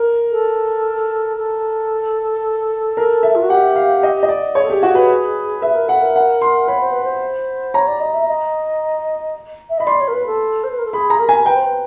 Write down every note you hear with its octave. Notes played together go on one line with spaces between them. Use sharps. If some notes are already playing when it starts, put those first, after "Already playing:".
Already playing: A#4
A4
A4
A#4
E5
F4
F#4
G4 F#5
F5
D#5
D#5
D5
G#4 C#5
A4
G4 G#4
F#4
B4
B4 E5
A#4
A4 F#5
A#4
F#5
C6
C#5 B5
C5
B4
C5
C#5 A#5
D5
D#5
E5
D#5
E5
D#5 B5
D5 C6
C#5
A#4
B4
A4
C5
B4
A#4
A4
G#4 B5
A#5
A#4
G#5
B4 G5
C5
B4